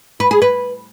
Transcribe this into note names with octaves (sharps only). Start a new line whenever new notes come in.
B4
G#4
B4